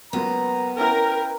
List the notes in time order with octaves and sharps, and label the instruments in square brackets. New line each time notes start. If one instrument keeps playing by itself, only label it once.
[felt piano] C#2 F#3 A#3 [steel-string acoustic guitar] B3 [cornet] A#5
[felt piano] C#4 E4 B4 [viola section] A#4 [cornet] G5